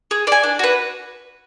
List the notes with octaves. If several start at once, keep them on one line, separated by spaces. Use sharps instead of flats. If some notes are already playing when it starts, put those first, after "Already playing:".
G#4
D5 G#5
D4
F#4 B4